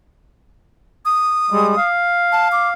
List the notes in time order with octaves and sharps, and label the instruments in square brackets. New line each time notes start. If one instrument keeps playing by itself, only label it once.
[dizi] D#6
[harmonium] G3 G#3
F5
[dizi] A5
D6